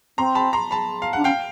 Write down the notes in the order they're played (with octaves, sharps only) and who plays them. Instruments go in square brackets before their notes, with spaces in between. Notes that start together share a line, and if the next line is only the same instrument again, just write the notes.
[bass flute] C4 [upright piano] A#5 C6
[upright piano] A5 B5
A#5 C6
A5 B5
F5
[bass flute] D4 [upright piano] F#5
[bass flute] C#4 [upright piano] F5 G5